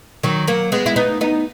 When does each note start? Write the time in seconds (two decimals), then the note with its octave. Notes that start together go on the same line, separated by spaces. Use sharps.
0.23 D#3 F#3
0.47 F#3 A#3
0.72 G#3 B3
0.86 E4
0.96 B3 D#4
1.21 B3 D#4